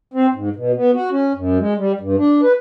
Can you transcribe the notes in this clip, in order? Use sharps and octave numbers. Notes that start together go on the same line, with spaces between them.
C4
G#2
B2
B3
F#4
C#4
F#2
G#3
G3
G2
D4
B4